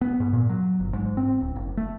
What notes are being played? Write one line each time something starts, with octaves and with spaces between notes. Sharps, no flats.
B3
G#2
A#2
F#3
G1
G#2
C4
D1
F#1
A3